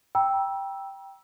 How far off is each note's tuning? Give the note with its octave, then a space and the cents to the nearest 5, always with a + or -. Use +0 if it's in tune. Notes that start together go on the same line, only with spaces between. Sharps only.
G5 +0 A#5 +45 E6 +0